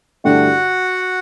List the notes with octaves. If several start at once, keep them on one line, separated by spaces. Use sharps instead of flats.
G2 D3 A3 E4 F#4 G4 F#5